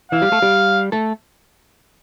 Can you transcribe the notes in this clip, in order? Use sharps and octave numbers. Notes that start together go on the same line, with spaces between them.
E3 E4 F5
G3 G4
A3 A4
G3 G4
A3 A4